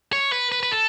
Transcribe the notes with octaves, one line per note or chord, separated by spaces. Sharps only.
C#5
B4
B4
B4
A4